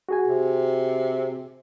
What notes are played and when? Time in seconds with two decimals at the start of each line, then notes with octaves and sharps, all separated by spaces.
0.09 F#4 G#4 G#5
0.28 C3